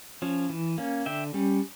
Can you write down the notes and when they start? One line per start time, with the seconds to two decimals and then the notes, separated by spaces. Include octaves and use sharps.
0.22 F3 C#4
0.50 E3
0.78 A#3 C#4
1.06 D3 E5 G5
1.34 G3 C#4